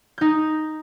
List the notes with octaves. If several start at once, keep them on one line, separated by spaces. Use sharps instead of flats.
D#4 G6